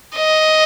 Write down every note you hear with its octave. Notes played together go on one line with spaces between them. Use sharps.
D#5